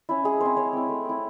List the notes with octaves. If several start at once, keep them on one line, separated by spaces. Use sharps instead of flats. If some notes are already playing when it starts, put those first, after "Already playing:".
C#4 E4
G#3 G#4
C4 E4 C5
G#3 C#5
C4 E4
A3
C4 E4